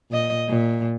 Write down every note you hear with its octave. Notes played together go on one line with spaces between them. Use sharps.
A#2 D#5
A#2